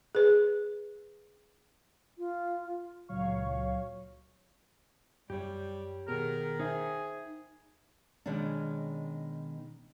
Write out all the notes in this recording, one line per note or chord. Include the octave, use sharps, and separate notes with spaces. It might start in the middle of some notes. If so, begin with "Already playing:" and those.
G#4 B4
F4
C#2 A#2 F#3 C#5 F5 C#6
F#2 G3 G4 C#5
B2 D#3 B3 G#4 A#4
D#4 G#4 C5 E5
B2 D#3 G#3 C#4 D4